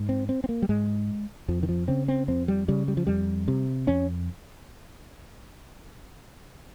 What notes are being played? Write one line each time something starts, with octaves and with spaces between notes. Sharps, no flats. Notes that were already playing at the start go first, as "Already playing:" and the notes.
Already playing: G#2
C4
C4
C4
A#3
G3
G#2 G#3
F2 F3
D#3
F3
C#3 C4
C4
F2 C4
G3
C#3 G3
G3
F3
F2 G3
C3
F2 C#4